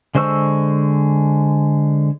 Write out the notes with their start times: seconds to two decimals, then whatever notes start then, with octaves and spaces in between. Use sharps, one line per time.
0.15 D3 G#3 C5 C#6 E6